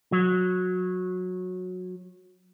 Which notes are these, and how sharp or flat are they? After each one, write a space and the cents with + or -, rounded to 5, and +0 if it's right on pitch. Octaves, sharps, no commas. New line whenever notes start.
F#3 -20